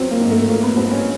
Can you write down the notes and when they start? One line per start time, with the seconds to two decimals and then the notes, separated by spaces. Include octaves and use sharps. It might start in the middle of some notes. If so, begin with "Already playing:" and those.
Already playing: E2 F#3 C4
0.11 A#3
0.21 G#2
0.31 A3
0.49 F#3 A#3
0.63 B3
0.77 G2 C4
0.91 C#4